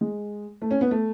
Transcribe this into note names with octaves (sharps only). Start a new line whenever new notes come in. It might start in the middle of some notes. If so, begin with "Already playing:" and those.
G#3
A3
C#4
B3
A3